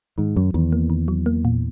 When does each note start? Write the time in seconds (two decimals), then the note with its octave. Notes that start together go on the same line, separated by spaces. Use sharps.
0.18 G#2 D#3
0.36 F#2 F#3
0.54 E2 D#3
0.72 A#3
0.90 D#3
1.08 F#3
1.26 A#3
1.45 A#2